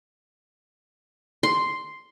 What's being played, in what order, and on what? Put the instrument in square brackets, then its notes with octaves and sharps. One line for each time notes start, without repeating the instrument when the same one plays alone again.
[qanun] C6